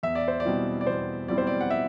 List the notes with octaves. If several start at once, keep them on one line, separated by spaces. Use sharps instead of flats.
E2 E5
D5
C5
D5
B2 G3 C4 E4
D5
E2 C5
B2 G3 C4 E4 D5
C5
D5
F#5
E5